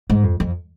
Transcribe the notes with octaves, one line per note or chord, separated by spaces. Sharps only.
G#2
F2
F2